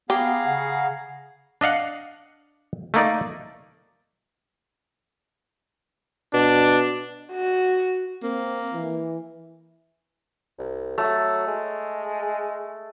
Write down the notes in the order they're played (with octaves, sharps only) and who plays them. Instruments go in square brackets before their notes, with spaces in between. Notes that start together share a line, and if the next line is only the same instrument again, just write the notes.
[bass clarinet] B3 [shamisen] G4 [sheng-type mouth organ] G#4 F5 A#5 [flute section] F#5
[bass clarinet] C#3 [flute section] F#5
[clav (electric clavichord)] D4 D#5 F5 F#5
A3 A#3 D#4 D5
[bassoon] B2 [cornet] D4
[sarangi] F#4
[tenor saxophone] A#3 [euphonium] C4
[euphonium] E3
[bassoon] C2
[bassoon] F#3 [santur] A3
[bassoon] G#3